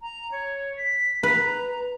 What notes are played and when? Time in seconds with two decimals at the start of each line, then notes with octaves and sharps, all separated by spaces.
0.02 A#5
0.32 C#5
0.77 B6
1.23 B4 A#5